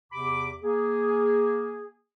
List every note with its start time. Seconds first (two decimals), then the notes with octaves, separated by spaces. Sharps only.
0.12 E2 C3 G4 B5 D6
0.63 A#3 G#4